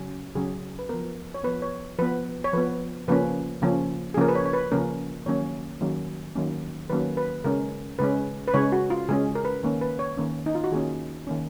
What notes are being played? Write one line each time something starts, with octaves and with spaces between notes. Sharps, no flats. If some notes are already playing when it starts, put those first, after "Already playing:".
Already playing: C#3 F#3 C#4
C#3 F#3 C#4 G#4
B4
F3 B3 A#4
C#5
F3 B3 B4
C#5
F3 B3 B4
C#5
F3 B3 B4
C#3 F3 A#3 C#4 B4
C#3 F3 A#3 C#4
G#4
C#3 F3 A#3 C#4 A#4
B4
C#5
C#5
B4
C#3 F3 A#3 C#4 A#4
D#3 F#3 A#3 C#4 C#5
D#3 F#3 A#3 C#4
D#3 F#3 A#3 C#4
D#3 F#3 A#3 C#4 B4
B4
C#3 G#3 C#4 A#4
C#3 G#3 C#4 B4
B4
C#3 G#3 C#4 C#5
F#4
F4
C#3 G#3 C#4 G#4
A#4
B4
D#3 A#3 C#4
B4
C#5
D#3 A#3 C#4
D#4
F4
F#4
D#3 A#3 C#4 G#4
D#3 A#3 C#4